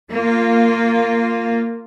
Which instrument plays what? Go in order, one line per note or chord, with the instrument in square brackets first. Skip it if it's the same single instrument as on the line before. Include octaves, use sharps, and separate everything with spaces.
[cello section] A#3 F4